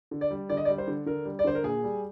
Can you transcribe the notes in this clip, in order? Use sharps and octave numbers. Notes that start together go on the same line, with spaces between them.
D3
D5
G3
D3 D5
D#5
D5
G3
C5
D3
D3 A#4
G3
D5
D3 C5
A#4
A#2 G#4
G3